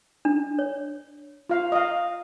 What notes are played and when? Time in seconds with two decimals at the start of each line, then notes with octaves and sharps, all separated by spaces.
0.25 D4
0.59 C#5
1.50 F4 F5
1.72 D#5 F5